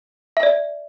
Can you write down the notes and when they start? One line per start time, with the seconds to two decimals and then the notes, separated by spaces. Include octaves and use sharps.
0.37 E5
0.43 D5